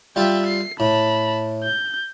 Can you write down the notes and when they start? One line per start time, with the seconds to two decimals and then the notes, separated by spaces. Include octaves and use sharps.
0.16 G3 F4 E5 G5
0.46 C7
0.80 A2 A5 B5
1.64 G6